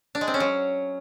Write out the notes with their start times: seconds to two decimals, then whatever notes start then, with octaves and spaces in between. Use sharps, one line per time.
0.15 D4
0.21 G#3
0.28 C4
0.34 C#4
0.40 F#3